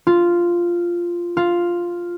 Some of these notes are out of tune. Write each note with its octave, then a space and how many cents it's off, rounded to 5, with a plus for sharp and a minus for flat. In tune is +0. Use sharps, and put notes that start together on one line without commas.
F4 -5
F4 +0